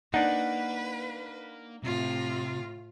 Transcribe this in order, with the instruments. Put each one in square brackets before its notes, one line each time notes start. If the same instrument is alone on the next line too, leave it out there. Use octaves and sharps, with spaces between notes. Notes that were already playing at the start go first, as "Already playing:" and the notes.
[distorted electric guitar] A#3 [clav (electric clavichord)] D4 D#4 [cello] B4 [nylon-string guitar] F#5
[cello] A2 F4 [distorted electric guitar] C3